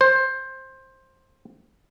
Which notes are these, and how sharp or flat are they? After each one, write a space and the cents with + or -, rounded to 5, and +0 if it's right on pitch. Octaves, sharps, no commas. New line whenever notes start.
C5 +15